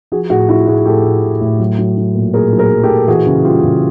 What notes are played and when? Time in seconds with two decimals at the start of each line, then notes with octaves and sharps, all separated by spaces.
0.12 F3 F#4 G#4
0.30 A2 F#4 G#4
0.49 F3 E4 F#4
0.67 A2 F#4 G#4
0.85 A2 G4 A4
1.05 A2
1.23 A2
1.41 A2
1.60 F#3
1.79 F#3
1.97 F#3
2.15 A#2
2.34 A#2 G#4 A#4
2.53 F#3
2.58 G#4 A#4
2.71 F#3
2.84 G4 A4
2.90 A#2
3.08 E3 F#4 G#4
3.26 C#3
3.45 G3 F4 G4
3.64 C#3